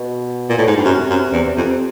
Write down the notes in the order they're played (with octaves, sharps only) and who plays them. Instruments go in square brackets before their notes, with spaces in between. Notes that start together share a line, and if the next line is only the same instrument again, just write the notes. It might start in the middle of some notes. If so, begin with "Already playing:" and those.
Already playing: [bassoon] B2
[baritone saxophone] A#2
A2
G#2
G2
[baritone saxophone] F#2 [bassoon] C3
[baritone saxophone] F#2
E2
F2